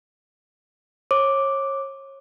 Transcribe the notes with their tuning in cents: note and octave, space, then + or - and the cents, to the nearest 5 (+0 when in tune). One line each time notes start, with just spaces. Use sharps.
C#5 -30 D6 +0